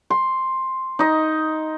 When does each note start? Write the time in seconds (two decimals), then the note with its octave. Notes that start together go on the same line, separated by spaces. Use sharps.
0.10 C6
0.99 D#4 D#5